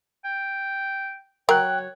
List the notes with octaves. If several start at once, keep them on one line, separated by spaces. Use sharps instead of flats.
G5
F#3 A#4 C#5 G5 F#6